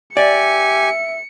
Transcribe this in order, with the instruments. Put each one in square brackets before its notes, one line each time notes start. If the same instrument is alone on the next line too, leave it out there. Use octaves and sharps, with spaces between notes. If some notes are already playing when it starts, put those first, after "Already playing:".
[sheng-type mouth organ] G4 G#5 [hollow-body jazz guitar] D5 [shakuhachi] E5 [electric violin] C#7